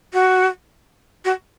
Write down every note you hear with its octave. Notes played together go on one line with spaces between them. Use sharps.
F#4
F#4